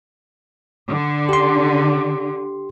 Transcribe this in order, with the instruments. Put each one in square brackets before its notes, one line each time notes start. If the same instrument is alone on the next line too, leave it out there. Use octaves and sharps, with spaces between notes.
[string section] D3
[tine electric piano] G4 C6